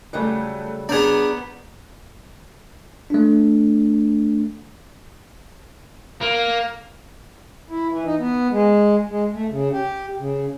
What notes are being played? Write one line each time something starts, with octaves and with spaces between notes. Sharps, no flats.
C#3 F#3 G3 A3 F#6
B3 D4 G#4 A#5 G6 F7
A3 D4
A#3
E4
E3
D#4
B3
G#3
G#3
A3
C#3
G4
C#3